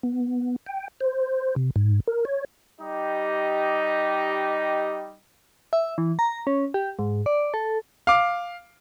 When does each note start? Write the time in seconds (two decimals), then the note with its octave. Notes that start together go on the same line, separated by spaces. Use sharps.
0.03 B3
0.66 G5
1.00 C5
1.56 C3
1.76 G#2
2.07 A#4
2.25 C#5
2.81 G3 D#4 G4 D#5
5.73 E5
5.98 E3
6.19 A#5
6.47 C#4
6.74 G4
6.99 G#2
7.26 D5
7.54 A4
8.07 F5 D6